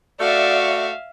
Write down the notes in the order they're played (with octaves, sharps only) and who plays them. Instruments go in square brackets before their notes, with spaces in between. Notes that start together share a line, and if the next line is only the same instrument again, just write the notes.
[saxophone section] A3 F#4 [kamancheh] D5 [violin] E5 F5